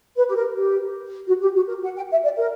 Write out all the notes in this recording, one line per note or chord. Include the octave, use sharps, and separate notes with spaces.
B4
G4
A#4
G4
F#4
G4
F#4
A#4
F#5
G5
E5
D5
A#4